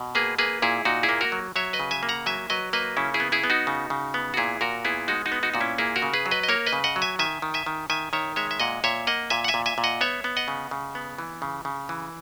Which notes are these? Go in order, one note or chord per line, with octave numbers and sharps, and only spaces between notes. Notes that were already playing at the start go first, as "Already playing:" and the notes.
Already playing: B2
A#3 G#4 B4
A#3 G#4 B4
A#2 E4 G#4
A#2 D#4 F#4
E4 G#4
A#3
F#4 A#4
F#3
F#3 C#5 E5
B4 D#5
C#3
E5 G#5
A#3
F#5 A#5
F#3 E5 G#5
F#3 B4 D#5
A#3 B4 D#5
C#3 C#4 E4
E4 G#4
B3
E4 G#4
B3
D#4 F#4
C#3
C#3
B3
F#4
A#2 E4 G#4
A#2 F#4 A#4
B3 E4 G#4
G#3 D#4 F#4
D#4 F#4
B3
D#4 F#4
A#2 F#4
C#4 E4
A#3 E4 G#4
F#4 A#4
C#3
G#4 B4
F#3
B4 D#5
D#5
A#3 A#4 C#5
B4 D#5
C#3
D#5 F#5
F#3
E5 G#5
D#3 E5 G#5
D#3
E5 G#5
D#3
D#3 E5 G#5
D#3 C#5 E5
G#3 C#5 E5
E5
A#2 D#5 F#5
A#2 C#5 E5
A#3 D#5 F#5
A#2 E5 G#5
F#5
E5 G#5
A#2
E5 G#5
A#2
D#5 F#5
B3 C#5 E5
B3
D#5 F#5
C#3
C#3
B3
E3
C#3
C#3
E3